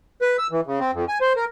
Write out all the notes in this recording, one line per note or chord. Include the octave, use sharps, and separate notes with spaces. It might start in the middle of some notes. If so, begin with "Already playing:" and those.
B4
E6
E3
C#3
C4
F2
G#5
C5
A#4